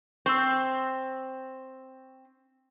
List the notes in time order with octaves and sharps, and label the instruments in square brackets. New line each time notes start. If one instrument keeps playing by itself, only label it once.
[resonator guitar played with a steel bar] C4 [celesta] C#6 E6